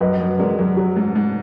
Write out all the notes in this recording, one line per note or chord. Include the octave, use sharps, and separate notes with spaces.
F#2 B4 D#5
F#2
G#3 A#4 D5
F#2
F#3
G#2
G#2